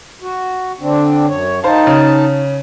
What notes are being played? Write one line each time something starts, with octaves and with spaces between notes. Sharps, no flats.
F#4
D3 C4 D4
F#2 C#5
D#3 D#4 C5 F5 A5
C#3